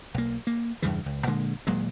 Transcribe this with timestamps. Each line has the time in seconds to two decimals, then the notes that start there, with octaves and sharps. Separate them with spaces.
0.14 B1 A#3
0.47 A#3
0.82 E2 G2 C#3 E3
1.06 C#2
1.27 A#2 D3 G#3 A#3
1.67 D#1 A#2 F#3 G#3